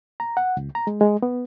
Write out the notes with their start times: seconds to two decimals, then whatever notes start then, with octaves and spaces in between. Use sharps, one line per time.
0.20 A#5
0.37 F#5
0.57 C#2
0.75 A#5
0.87 G#3
1.01 G#3
1.22 B3